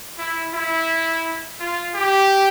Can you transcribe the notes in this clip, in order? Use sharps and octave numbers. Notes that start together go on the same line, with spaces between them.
E4
E4
F4
G4